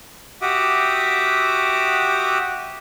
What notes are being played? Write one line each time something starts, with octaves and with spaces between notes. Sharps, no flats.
F#4 G4 E5 F#5 D6 D#6